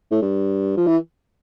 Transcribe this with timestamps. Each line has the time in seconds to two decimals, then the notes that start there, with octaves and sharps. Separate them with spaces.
0.11 A2
0.22 G2
0.77 F3
0.87 E3